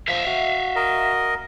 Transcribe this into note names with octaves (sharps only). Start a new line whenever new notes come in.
F3 E5 F5
F#4
A#4 D#5